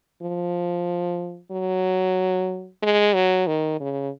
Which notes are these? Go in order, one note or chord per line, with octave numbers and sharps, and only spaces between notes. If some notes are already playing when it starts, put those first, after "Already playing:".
F3
F#3
G#3
F#3
D#3
C#3